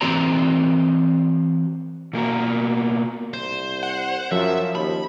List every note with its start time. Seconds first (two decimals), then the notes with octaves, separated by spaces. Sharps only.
0.01 E3 C4 F#4 C5 C#5 A#5
2.13 B2 A#3 F#4 A#4
3.34 C2 C5
3.83 F#5
4.32 F#2 F3 E5
4.75 D#2 B5